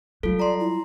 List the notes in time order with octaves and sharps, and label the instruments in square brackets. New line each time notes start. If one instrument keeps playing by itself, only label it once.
[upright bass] F#3 G3 [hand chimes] F4 A4
[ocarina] D5 [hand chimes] A#5 C6
[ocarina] E4